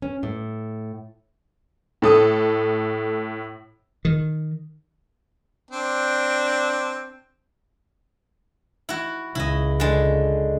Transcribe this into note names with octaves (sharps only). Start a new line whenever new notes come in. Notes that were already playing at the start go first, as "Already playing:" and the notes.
C#4
A2
A2 A4 D#6
D#3
C4 D4
E4 F#4
C#2 C#3 E4 D#5
D3 G#3